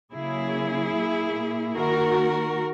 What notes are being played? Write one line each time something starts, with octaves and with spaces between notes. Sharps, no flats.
C#3 F#3 A#3 E4 G#4
A#2 A#3
D#3 A#3 F#4 A#4